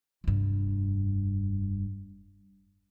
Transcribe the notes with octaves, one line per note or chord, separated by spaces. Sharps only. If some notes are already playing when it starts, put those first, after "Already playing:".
F1 G2